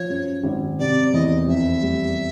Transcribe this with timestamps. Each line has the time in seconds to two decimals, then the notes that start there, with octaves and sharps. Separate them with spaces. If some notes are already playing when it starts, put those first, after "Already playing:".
Already playing: F3 C#5
0.10 F#2
0.44 G#1
0.79 C3 D5
1.13 E2 D#5
1.48 F2 E5
1.83 G3